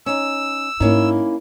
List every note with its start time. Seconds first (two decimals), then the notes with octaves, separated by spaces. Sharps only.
0.06 C#4 D#4 E6
0.80 G#2 A#3 C#4 D#4 E4